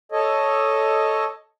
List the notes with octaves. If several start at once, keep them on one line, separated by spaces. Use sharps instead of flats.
A4 C#5 D#5